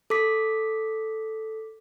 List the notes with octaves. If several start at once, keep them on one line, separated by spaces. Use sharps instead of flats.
A4 D6 B6